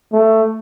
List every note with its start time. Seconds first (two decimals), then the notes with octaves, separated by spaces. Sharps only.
0.13 A3